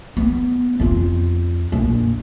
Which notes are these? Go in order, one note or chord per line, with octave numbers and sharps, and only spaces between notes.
B3
F2 F4
A#1